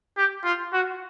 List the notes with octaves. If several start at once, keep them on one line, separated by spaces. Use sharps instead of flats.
G4
F4
F#4